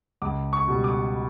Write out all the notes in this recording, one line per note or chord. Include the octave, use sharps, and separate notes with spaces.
C#2 D6
C#6
B2 G3
D6